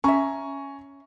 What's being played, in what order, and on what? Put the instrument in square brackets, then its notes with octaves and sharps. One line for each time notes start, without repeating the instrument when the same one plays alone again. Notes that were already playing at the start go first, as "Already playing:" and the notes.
[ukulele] C#4 E5 [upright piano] G#5 A#5 C#6